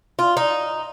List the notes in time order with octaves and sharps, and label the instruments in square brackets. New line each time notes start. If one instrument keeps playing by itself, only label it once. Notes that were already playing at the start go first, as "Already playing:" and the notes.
[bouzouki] F4
D#4